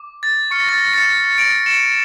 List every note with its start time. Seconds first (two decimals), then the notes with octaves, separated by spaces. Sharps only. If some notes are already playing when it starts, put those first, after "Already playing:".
Already playing: D6
0.23 A6
0.51 C#6 F6 C#7
0.60 A#6
0.69 A6
0.78 A#6
0.94 A6 C#7
1.37 A#6 D7
1.66 C#7 E7